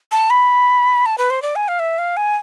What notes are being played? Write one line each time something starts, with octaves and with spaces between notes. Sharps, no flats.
A5
B5
A5
B4
C5
D5
G#5
F5
E5
F5
G#5